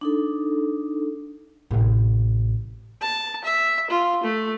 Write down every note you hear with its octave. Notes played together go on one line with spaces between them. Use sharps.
D4 D#4 A4
A1 C3
A5
E5
F4
A3